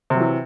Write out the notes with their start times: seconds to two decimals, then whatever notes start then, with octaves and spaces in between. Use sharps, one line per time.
0.10 C3
0.15 F#3
0.20 E3